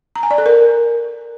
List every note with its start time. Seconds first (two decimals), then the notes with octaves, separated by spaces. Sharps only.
0.16 A#5
0.23 G#5
0.31 D5
0.38 A4
0.46 A#4